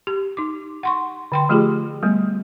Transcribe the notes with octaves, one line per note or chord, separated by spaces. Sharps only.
G4
D#4 D6
F#5 C6 C#6
D3 G5 C6
F3 A3 F4 G4 G#4
G3 A3 B3